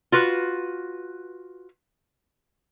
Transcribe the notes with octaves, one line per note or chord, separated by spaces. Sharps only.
F4 F#4 B4